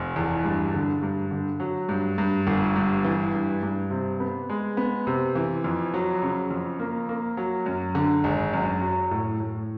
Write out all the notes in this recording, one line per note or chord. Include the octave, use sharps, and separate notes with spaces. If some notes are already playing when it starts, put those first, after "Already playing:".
Already playing: F1
E2
G2
D3
G2
D3
F#3
G2
G2
G1
G2
E3
G2
G2
C3
B3
G#3
B3
C3
E3
F2
F#3
C#3
F2
A#3
A#3
F#3
F#2
D3
G#1
F#2
F#3
A2
A2